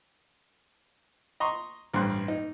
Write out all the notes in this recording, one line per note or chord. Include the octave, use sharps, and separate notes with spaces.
D#5 A#5 C6 C#6
A1 G2 C5 F#6
D#4